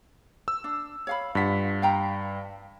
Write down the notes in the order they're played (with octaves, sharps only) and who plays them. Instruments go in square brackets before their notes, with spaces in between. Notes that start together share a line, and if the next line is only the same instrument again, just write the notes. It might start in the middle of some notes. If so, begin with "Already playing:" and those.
[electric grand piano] E6
[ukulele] D4
C#5 F5 B5
[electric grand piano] G2 B6 [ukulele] F4 F#5
[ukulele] F5 G5 A#5